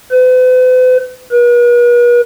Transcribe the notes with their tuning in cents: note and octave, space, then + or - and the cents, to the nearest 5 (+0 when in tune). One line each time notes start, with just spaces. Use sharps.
B4 +45
B4 -45